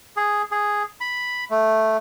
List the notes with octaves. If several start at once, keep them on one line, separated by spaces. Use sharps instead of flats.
G#4
G#4
B5
A3